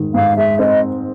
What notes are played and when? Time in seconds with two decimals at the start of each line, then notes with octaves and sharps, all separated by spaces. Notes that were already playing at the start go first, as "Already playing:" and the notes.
Already playing: G#2 D#3
0.14 G#2 F5
0.37 G#3 E5
0.59 C4 D#5